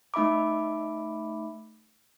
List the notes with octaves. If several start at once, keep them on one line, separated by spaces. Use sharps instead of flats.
A3 D#4 E5 B5 D6